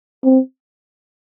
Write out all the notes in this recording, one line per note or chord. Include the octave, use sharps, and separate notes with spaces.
C4